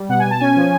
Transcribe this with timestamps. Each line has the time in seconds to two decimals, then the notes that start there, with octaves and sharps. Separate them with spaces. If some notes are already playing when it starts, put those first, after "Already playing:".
Already playing: G3
0.09 B2 F#5
0.19 G#5
0.25 B2
0.31 A5
0.40 C#4 G#5
0.56 F3